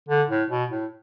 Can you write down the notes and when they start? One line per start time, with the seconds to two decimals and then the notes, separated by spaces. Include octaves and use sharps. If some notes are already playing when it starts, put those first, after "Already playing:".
0.09 D3
0.30 A2
0.50 B2
0.71 A2